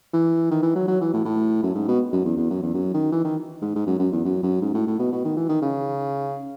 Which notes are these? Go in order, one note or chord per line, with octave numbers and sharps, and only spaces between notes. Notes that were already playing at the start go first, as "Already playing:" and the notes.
E3
D#3
E3
F#3
F#3
E3
A2
A2
F#2
G#2
B2
F#2
E2
E2
F#2
E2
F#2
D#3
E3
D#3
G#2
G#2
F#2
F#2
E2
F#2
F#2
G#2
A2
A2
B2
B2
D#3
E3
D#3
C#3